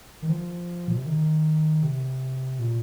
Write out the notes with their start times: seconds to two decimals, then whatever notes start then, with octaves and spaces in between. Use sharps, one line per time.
0.22 D#3
0.29 F3
0.88 A#2
0.97 C3
1.06 D#3
1.83 C3
2.59 A#2